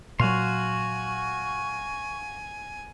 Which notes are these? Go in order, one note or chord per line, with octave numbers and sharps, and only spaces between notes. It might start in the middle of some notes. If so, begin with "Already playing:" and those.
A#2 F#3 F#4 F5 G#5 C6 C#6